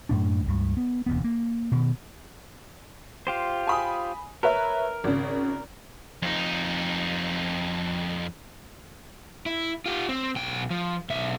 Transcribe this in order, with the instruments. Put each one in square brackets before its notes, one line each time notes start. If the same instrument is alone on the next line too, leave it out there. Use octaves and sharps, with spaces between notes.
[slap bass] F#2 A2 D4
C#2 G2
B3
E1 D2 B3
A#3
B2 D#3
[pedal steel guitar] F4 G4 C5
[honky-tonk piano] G#5 B5 D#6
[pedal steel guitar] A#4 [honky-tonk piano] B4 C#5 E5
[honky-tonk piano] G#1 C#3
[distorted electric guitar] F2 D#4
[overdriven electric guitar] E4
F4 G4
C4
B1 G5
F3
B1 E5